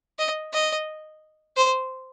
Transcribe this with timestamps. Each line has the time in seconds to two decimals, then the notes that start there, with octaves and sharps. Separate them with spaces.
0.19 D#5
0.53 D#5
1.57 C5